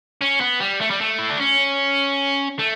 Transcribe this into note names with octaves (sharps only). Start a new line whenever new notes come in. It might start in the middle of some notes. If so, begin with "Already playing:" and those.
C#4
B3
G3
A3
G3
A3
E4
D4
C#4
A3